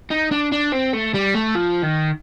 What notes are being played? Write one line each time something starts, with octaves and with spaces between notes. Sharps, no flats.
D#4
D4
D4
C4
A3
G3
A3
F3
D#3